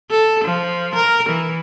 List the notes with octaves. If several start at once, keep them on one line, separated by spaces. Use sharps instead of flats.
A4
F3
A#4
E3